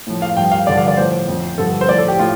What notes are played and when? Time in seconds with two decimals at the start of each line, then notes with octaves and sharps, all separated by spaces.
0.07 A2 F3
0.22 F5
0.36 G2 F3 G5
0.51 F5
0.67 G2 D3 F3 D5
0.77 F5
0.88 D5
0.97 A2 F3 C5
1.28 F2 F3
1.58 G2 D3 F3 A4
1.81 C5
1.88 A2 F3 D5
1.98 A4
2.08 G4
2.19 A2 F4